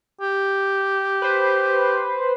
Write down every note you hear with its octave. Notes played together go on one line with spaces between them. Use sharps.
G4
B4 C5